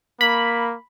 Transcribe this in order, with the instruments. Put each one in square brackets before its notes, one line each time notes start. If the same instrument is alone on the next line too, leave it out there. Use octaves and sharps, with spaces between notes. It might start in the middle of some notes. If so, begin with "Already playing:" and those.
[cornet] A#3 [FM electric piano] B5